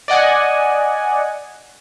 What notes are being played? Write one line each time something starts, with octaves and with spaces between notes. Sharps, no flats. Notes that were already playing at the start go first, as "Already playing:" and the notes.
D5 D#5 F#5 G#5